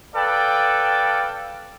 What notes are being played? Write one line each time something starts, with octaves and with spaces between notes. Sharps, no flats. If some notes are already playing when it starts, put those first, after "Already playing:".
A4 B4 D5 F5 G5